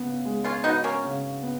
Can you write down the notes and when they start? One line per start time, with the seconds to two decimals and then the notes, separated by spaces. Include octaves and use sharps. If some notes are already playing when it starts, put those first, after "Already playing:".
Already playing: C#3 B3
0.25 G#3
0.44 C#4 F4
0.64 B3 D#4 F#4
0.84 A#3 C#4
1.04 C#3
1.43 B3